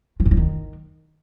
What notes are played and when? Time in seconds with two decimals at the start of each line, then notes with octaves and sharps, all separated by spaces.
0.20 F3
0.25 G2
0.31 F3
0.37 D#3